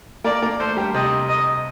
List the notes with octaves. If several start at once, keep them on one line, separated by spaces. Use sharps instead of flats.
A#3 A#4 D5
A#3 A#4
A3 A4 C5
G3 G4
C3 C4 D#5
D#5